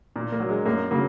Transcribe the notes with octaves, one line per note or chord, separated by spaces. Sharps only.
A#2
A#3
F#3
G#3
F#2 A#3
C#3 F#3 A#3